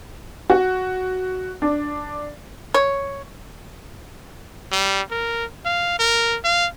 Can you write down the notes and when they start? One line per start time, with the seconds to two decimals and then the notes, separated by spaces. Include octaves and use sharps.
0.50 F#4
1.62 D4
2.74 C#5
4.72 G3
5.11 A#4
5.65 F5
5.99 A#4
6.44 F5